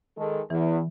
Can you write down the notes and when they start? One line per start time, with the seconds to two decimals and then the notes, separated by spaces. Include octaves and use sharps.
0.17 D#3 G#3 A4
0.50 E2 E3